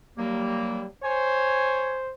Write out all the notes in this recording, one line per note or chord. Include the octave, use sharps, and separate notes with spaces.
D#2 F#3 G3 A#3
C5 C#5 G#5